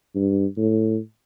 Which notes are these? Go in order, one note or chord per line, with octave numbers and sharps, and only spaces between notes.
G2
A2